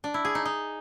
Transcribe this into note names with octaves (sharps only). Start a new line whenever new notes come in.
D4
E4
G#4
D#4
D#4